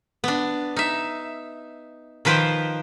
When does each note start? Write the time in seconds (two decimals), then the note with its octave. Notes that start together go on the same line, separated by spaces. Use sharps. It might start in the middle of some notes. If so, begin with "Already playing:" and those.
0.24 B3 D4
0.76 D#4 E5
2.25 D#3 F3 B4 C5 G5